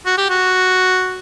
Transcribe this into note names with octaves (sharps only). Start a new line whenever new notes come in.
F#4
G4
F#4